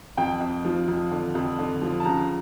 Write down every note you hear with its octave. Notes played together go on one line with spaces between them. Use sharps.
F2 G5
F2
F3
F2
D3
F2
D3
F3
A5
C#2 A#5